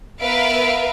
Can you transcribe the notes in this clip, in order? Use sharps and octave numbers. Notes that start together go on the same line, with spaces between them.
B3 A#4 B4 E5 F5 D7